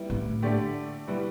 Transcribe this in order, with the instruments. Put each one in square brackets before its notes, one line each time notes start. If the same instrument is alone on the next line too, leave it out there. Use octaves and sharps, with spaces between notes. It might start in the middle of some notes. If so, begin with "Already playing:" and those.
Already playing: [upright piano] G3 B3 E4
[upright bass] A2
[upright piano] D3 A3 G4 D5
B2 G3 E4 B4